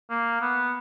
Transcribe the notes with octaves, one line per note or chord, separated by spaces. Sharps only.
A#3
B3